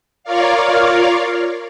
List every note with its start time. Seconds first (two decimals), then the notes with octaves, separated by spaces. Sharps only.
0.24 F4 A#4 C#5 D5 F5